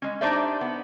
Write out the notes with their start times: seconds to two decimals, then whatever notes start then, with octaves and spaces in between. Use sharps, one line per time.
0.02 G#3 C#4
0.21 D4 D#4 G4 C5 D5 E5
0.61 B3